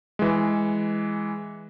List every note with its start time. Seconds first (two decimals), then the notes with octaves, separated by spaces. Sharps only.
0.19 E3 G#3